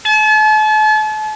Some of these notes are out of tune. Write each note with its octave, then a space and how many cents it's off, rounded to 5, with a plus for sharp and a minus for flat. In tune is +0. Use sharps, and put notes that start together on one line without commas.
A5 -40